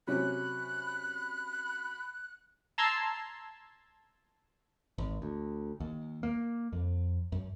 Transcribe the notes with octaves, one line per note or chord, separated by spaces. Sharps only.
C3 F#3 C#4 B5 F#6
A5 A#5 C6 E6 G#6
G#1
D2
D#2
A#3
F2
F#2